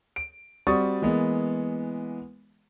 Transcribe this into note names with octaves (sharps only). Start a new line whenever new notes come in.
D7
G3 C4 F#4 C#6 D#6 A6
E3 G#3 A#3 B3